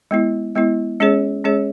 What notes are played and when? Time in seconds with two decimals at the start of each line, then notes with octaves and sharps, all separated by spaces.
0.11 G#3 B3 E4
0.55 G#3 B3 E4
1.00 G#3 C#4 G#4 C#5
1.44 G#3 C#4 G#4 C#5